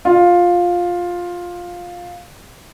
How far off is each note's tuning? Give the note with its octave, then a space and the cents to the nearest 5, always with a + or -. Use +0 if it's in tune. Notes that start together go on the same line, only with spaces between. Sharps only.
F4 +10